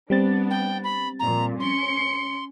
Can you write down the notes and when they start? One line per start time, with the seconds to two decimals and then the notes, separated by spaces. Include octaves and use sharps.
0.10 G3 B3 C4 D4 A6
0.50 G5
0.84 B5
1.19 F2 A#2 A#5
1.60 C#4 C6 C#7